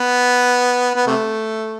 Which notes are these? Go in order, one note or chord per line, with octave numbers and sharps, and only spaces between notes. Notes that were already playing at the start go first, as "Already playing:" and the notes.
Already playing: B3
B3
C3 A3